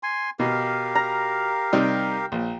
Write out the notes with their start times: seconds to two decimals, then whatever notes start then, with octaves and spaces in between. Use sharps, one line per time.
0.03 G#5 C6
0.39 B2 G4 A#4 F5
0.95 A#5
1.73 C3 G3 D#4 G5
2.32 A#1